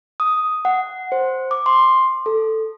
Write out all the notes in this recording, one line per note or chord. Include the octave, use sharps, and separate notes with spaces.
D#6
F#5
C5
D6
C6
A4